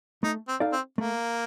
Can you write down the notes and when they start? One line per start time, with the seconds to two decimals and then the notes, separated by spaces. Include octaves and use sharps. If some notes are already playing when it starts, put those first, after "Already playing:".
0.23 A3 D#4
0.48 C4
0.60 D#4 A4 D5 F5
0.73 C4
0.98 A3 A#3